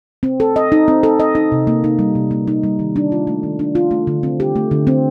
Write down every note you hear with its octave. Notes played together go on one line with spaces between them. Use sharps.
C4
A4
D#5
D#4
C4
A4
D#5
D#4
C3
A#3
D#4
G3
C3
A#3
D#4
G3
D#3
D4
F4
A3
D#3
D4
F4
A3
D3
C4
G4
A3
D3
C4